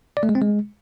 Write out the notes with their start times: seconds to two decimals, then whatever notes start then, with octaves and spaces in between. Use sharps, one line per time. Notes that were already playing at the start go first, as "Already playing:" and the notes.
0.17 D5
0.23 A3
0.29 G#3
0.35 C4
0.41 G#3